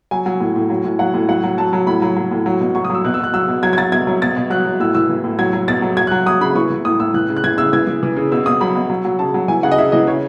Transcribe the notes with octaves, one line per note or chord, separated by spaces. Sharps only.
F#3 G#5
F#3
A2
A2
F#3
A2
F#3 F#5
A2
F#3 F#5
F#3
F#3 A5
F#3
A2 B5
F#3
F#3
A2
F#3
B2
F#3 C#6
D#6
F#3 E6
B2 F#6
E6
B2 F#6
F#3 E6
B2
F#3 G#6
G#6
F#3 A6
B2 G#6
F#3
B2 A6
B2
F#3 F#6
F#3
A2 E6
E3 E6
E3
A2
F#3 G#6
F#3
B2 A6
F#3
F#3 G#6
F#6
F#3
F#3 D#6
C#3 B5
E3 C#6
E3
A2 D#6
A2 E6
E3 F#6
C#3
F#6
E3 G#6
C#3 E6
E3 G#6
E3
E3
C#3
B2 E6
B2 D#6
F#3 B5
B2
F#3
F#3
C#3 A5
F#3
E3 G#5
C#3 F#5
D#5
C#3 E5
E3 D#5
C#3 C#5